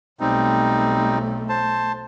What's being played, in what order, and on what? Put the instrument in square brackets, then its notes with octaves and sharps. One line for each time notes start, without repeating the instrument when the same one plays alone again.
[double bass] B1 A3 [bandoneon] G3 C4 D#4
[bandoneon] C5 A5